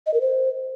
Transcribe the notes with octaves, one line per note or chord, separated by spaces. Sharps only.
D#5
A#4
C5